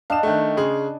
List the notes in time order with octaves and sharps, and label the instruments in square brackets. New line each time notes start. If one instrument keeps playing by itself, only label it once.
[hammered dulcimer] D4 D#5 G5 [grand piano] F5 E7
[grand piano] D#3 A3
C#3 G#4 C6